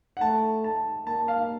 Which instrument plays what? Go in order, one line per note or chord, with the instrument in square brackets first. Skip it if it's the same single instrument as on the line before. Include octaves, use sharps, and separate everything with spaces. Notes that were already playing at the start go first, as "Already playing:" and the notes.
[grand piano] F#5
[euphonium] A3 [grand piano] A5
[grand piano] A5
[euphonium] A#3 [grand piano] A5
[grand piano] F5